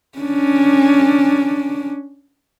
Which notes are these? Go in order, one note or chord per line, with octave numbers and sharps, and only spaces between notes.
C#4 D4